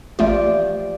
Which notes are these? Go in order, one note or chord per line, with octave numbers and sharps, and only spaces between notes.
A1 F3 A3 F4 G4 D5